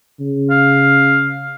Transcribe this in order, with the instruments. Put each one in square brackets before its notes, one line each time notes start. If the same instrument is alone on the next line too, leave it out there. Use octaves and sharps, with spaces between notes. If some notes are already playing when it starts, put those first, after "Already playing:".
[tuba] C#3
[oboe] F5